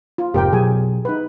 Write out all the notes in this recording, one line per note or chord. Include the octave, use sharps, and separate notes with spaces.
F4
F1 G#2 C3 G4 A#4 G5
B2 F#3 G#4 G#5
D#4 B4